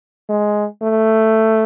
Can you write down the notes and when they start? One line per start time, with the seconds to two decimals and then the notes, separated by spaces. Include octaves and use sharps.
0.29 G#3
0.82 A3